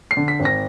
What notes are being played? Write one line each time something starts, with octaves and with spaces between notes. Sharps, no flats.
C7
D3
B6
G#1
A#6